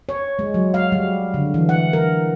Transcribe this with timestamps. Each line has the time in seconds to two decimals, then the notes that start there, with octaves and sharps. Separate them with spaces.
0.09 C#5
0.39 G#3
0.54 F#3
0.74 F5
0.92 G3
1.34 D3
1.54 E3
1.69 F#5
1.93 A#4